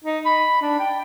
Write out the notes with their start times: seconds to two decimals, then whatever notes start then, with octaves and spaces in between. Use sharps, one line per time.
0.04 D#4
0.25 B5
0.62 D4
0.79 G5